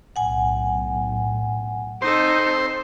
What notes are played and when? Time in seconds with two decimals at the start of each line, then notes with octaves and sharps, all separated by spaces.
0.16 B1 A2 F#5 G#5
2.02 C4 D#4 A4 C5